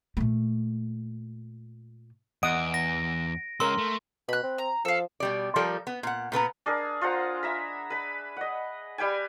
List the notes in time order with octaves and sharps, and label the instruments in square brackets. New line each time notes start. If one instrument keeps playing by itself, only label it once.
[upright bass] A#2 A3
[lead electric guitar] E2 [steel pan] D#5 F#5 D#6 [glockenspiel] D7
[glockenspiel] A#6
[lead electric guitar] G#3 C#4 [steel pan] A#4 E6 [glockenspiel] C6
[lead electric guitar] A3
[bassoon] B2 [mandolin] B5 F#6
[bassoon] C4
[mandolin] A#5
[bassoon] F3 [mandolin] A4 F5
[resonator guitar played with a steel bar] B2 G3 D5
F3 G3 A4 A#4 D5
B3
A#2 F#5
A#2 B3 B4 A#5
[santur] D4 G#4 A#4
F4 C5 F#5 A#5
E5 A#5 B5
B4 B5
D#5 F#5
G3 B4 G5 G#5